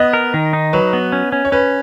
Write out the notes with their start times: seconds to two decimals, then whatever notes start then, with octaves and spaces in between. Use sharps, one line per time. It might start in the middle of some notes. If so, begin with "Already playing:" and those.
Already playing: B3 D#5
0.13 A#4
0.34 D#3
0.53 D#4
0.73 F#3 B4
0.93 B3
1.12 C#4
1.32 C#4
1.45 C#5
1.52 C#4 B4